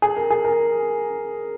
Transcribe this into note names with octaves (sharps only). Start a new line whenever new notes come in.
G#4
A#4
G#4
A#4